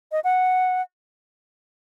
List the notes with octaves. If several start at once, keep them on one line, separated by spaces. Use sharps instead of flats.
D#5
F#5